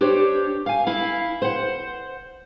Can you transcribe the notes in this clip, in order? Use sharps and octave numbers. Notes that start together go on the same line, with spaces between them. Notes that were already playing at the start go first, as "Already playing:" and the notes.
D4 G4 C5 C#5
F5 G#5
E4 F5
C5 F#5